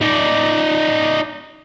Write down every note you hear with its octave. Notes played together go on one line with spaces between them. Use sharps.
D#4 D5